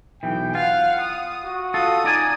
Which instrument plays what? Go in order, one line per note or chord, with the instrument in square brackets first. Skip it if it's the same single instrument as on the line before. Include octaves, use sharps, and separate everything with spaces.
[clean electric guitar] B1 E3 [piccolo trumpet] G5
[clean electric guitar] F4 [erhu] F5 [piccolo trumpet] F#5
[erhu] D#6
[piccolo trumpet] F#4
[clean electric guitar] F4 A4 [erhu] D#6
[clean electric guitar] D#4 D5 G#5 [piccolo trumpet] A#5